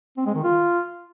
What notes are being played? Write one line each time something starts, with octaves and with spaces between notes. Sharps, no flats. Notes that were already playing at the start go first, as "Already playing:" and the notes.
C4
G#3
D#3
F4